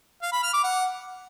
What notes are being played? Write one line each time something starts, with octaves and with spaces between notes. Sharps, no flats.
F5
B5
F6
D6
F#5